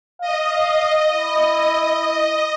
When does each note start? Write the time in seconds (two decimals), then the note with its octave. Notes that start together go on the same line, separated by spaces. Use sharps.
0.21 D#5 F5
1.13 E4